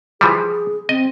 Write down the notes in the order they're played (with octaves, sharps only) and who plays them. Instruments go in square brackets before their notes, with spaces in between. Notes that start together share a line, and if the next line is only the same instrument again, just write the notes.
[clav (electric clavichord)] E3 F3 G3 [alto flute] G#4
[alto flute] C4 [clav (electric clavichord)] D#5